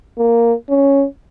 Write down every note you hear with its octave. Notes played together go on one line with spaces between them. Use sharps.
A#3
C#4